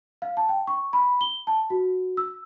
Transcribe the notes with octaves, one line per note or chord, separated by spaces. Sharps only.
F5
A5
G5
C#6
B5
G7
A5
F#4
E6